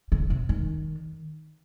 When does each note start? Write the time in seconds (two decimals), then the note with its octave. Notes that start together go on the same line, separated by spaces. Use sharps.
0.12 C#3
0.30 C3
0.49 D#3